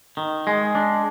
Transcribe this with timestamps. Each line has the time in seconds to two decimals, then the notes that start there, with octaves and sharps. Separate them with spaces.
0.17 D#3
0.47 G#3
0.75 D4